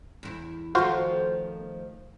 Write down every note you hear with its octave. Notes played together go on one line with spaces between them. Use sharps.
E2 E4
D#3 F3 A3 F4 F#4 C5